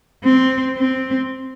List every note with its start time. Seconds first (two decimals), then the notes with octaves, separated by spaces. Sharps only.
0.25 C4
0.77 C4